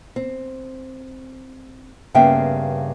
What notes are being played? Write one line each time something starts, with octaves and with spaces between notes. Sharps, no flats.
C4
G2 C#3 A#3 B3 E5 G5